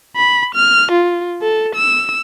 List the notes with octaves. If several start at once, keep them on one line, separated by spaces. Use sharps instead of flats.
B5
F6
F4
A4
E6